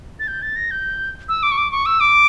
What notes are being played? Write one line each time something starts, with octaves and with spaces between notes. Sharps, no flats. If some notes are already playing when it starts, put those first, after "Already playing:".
A6
G6
A6
A#6
G6
E6
D6
C#6
D6
C#6
E6
D6